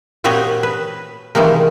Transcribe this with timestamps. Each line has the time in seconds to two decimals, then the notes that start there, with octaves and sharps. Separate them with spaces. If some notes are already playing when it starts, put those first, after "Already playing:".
0.24 A#2 C4 F#4 G4 C#5 D#5
0.63 B4
1.35 C3 D#3 E3 G3 G#3 A#3